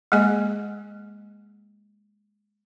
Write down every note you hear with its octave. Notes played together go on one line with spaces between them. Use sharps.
G#3 A#3 G#4 D#5 G#5